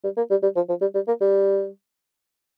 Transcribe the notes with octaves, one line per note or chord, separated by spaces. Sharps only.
G3
A#3
G3
G3
F3
F3
G3
G3
A#3
G3